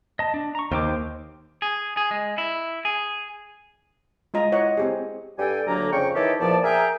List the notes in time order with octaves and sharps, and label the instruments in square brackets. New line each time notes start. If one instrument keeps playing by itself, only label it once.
[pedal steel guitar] D#5 A5
D4
A#5 C#6
[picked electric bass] D#2 [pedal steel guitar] C5 G5 D6
[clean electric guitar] G#4
G#4
G#3
E4
G#4
[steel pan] G#3 F4 D#5 A#5
E4 C#5 D#5 F#5
C4 G4 G#4
[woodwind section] G2 G3 A4 G5 G#5
D2 D3 F#3 A#3 A#5
F2 C#3 G5 C#6
D#3 E3 D#4 G4 A4 C#5
E2 A#2 F3 D5 A5
G#4 A#4 E5 G5 G#5 A#5